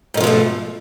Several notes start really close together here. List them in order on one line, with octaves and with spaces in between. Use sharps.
G#2 D#3 F3 B2 A3